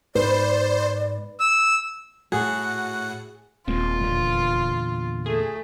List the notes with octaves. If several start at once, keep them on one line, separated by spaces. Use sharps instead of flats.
G#2 B4 C5 D5
E6
A2 F#4 G#4 F#5
D#1 G#3 A#3 C4 F4
E2 A#2 D3
A3 G#4